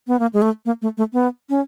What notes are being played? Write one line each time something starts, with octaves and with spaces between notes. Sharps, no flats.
B3
A#3
G#3
A3
A#3
A3
A3
B3
C#4